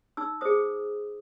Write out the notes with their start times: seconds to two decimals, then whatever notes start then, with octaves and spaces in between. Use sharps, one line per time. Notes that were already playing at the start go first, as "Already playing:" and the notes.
0.17 D#4 E6
0.41 G#4 C5 D#6